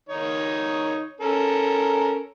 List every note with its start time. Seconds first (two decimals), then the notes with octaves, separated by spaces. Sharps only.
0.09 D#3 D#4 C#5
1.20 C#4 A4 A#4